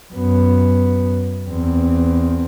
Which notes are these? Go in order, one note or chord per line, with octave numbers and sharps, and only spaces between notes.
F#2 B3
E2 C4